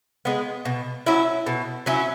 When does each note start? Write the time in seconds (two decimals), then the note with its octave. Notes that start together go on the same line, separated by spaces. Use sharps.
0.25 G#3 B3
0.65 B2
1.06 F#3 C#4 E4
1.46 B2
1.86 F#3 C#4 E4